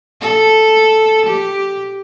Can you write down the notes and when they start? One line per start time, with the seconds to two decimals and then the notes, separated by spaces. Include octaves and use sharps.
0.21 A4
1.26 G4